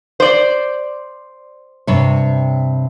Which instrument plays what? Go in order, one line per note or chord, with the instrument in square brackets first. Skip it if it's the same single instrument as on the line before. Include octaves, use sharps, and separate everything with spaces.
[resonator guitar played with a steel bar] C5 D5
[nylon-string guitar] G2 C3 C#5